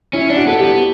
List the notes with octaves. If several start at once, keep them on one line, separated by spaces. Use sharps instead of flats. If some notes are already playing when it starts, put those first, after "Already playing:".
C#4 E4
D4
F#4
B3 A4
G4
B3